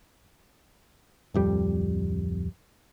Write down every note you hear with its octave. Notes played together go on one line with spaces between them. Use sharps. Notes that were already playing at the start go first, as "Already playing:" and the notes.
D1 F2 G3